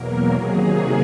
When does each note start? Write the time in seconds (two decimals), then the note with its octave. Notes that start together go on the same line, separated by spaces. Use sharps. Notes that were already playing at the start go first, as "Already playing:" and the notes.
Already playing: E2 B2 F#3 A#3 A#4
0.34 C3 D#3 F#3 A#3 G#4